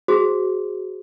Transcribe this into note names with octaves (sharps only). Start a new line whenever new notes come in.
F#4 G#4 C5